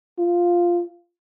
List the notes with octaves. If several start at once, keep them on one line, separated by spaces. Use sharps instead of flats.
F4